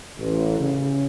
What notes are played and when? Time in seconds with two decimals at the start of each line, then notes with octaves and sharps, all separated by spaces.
0.19 A1
0.59 C#3